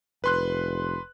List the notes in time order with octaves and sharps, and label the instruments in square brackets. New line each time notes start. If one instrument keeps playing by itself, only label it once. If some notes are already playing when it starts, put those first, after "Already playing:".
[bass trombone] F1 [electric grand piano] B4 C6 F#6